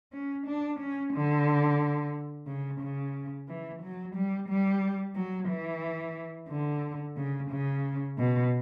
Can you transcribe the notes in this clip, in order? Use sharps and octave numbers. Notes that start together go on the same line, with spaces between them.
C#4
D4
C#4
D3
C#3
C#3
E3
F#3
G3
G3
F#3
E3
D3
C#3
C#3
B2